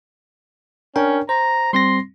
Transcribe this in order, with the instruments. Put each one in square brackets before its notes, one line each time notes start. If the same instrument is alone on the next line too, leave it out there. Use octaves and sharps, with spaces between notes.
[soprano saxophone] C#4 [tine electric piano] D4 A#4 G5
[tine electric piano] C5 [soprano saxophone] A#5
[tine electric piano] G3 C4 A#6 [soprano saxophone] C6